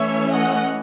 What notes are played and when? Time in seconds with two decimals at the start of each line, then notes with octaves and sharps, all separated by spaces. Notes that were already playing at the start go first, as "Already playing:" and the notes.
Already playing: E3 A3 C#4 C#5 E5
0.33 D#5 F#5